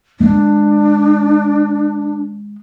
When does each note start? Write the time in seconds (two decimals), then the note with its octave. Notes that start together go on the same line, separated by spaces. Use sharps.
0.20 D#3 G#3 D4